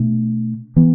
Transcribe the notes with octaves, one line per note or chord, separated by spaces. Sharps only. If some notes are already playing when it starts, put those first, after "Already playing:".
Already playing: B2 A3 D4
E3 B3